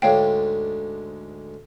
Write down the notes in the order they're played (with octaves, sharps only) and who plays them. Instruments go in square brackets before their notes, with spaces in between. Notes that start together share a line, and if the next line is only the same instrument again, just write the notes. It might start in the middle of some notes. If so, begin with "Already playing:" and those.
[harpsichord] D2 G#2 D3 [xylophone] C#5 F5 G5